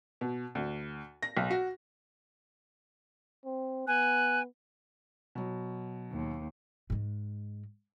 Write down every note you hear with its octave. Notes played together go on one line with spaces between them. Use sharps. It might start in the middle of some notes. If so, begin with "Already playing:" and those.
B2
D2
A#6
B1
F#4
C4
B3 G#5 F#6
B2 F#3
D#2
G#2 G#3